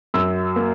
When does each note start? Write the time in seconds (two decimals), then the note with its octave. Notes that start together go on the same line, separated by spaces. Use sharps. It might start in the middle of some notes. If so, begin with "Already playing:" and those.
0.14 F#2 E6
0.56 A#3